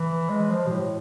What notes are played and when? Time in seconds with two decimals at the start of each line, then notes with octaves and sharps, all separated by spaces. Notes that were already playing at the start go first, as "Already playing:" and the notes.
Already playing: E3
0.30 G#3
0.50 F3
0.66 B2
0.71 A2